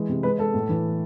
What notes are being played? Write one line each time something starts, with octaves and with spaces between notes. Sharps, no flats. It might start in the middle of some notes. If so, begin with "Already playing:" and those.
Already playing: E3 G#3
C3
G#3 B4
G#3 A4
A2
E3